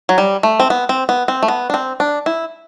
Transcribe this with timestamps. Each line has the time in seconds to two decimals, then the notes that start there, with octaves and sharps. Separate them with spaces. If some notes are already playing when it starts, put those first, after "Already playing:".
0.09 F#3
0.18 G3
0.43 A3
0.60 C4
0.70 B3
0.89 C4
1.09 B3
1.28 C4
1.42 A3
1.48 B3
1.70 D4
1.74 C4
2.00 D4
2.26 E4